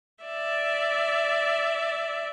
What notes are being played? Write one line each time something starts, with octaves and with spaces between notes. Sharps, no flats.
D5 E5